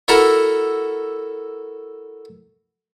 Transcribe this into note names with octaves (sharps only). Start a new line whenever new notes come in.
E4 F#4 A4 A#4 F#5 A#5